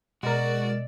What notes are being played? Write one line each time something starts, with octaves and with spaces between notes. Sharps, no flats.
B2 G#3 F#4 A#4 D5 D#5 E6